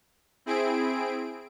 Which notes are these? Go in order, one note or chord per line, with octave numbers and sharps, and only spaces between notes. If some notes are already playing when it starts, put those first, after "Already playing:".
C4 E4 G#4 D7